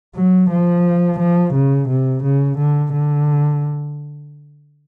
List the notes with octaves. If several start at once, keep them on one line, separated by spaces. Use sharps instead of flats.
F#3
F3
F3
C#3
C3
C#3
D3
D3